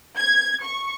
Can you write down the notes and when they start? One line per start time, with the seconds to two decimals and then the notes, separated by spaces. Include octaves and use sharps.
0.18 G#6
0.63 C#6